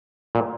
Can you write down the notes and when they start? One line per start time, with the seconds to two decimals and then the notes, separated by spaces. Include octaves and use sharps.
0.35 A#2